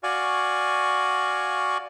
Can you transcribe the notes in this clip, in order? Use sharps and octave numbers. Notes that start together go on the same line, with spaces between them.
F#4 D5 F5 G#5 C#6